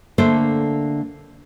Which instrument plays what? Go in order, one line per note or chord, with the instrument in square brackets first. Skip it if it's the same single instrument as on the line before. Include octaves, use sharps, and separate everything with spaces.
[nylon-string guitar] D3 A3 A#3 D4 A4 C5